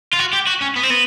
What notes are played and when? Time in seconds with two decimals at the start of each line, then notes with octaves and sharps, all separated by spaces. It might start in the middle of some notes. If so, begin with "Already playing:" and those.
0.14 F4
0.20 F#4
0.34 G4
0.48 F#4
0.62 C#4
0.76 B3
0.83 C4
0.90 B3